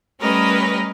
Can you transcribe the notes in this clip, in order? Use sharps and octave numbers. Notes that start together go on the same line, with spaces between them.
G3 A3 C#4 A#4 B4 D#5